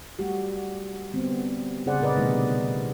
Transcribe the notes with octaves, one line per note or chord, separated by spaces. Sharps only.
G3 A3 F#4 G4
D3 G3 B3 C4
C#3 C#4 G#4 C5 D5 F#5
A#2 C#3 A#4 B4 D5 D#5
B2 D3 D#3 G3 A3 D#4